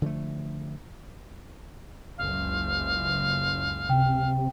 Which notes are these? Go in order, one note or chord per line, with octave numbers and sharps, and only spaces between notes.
D3 F3 G3 A3
F#1 C#2 F5
C3 G5